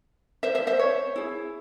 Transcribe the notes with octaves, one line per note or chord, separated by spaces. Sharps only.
C5 E5
C5 E5
C5 E5
C#5
E4 G#4